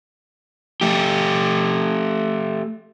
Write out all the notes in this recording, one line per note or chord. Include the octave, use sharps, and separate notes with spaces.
A3 G4